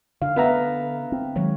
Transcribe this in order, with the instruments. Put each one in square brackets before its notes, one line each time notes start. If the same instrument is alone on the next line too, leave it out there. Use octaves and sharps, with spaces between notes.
[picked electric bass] D3 [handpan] F5
[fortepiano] B3 E5 A#5
[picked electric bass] C4
[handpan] D#3 G#3 C#5 [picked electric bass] F#3